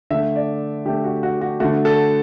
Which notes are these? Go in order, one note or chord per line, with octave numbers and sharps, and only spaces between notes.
D3 A3 E5
D5
D3 A3 G4
F#4
F#4
F#4
D3 A3 F#4
A4